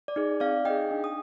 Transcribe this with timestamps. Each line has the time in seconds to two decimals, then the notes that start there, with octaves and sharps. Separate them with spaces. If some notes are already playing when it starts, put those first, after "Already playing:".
0.08 D5
0.16 D#4 G#4
0.40 C4 D5 F5
0.65 D#4 D#5 G5
0.70 G#4
0.91 D4
1.04 D#6